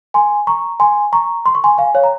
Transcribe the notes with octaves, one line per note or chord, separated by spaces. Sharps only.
G#5 C6
A#5 C#6
G#5 C6
A#5 C#6
C6
C#6
G#5 C6
F5 G#5
C#5 F5
A#5